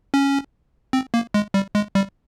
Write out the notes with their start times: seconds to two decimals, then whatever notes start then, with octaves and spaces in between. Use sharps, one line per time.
0.14 C#4
0.93 C4
1.14 A#3
1.34 G#3
1.54 G3
1.75 G#3
1.95 G3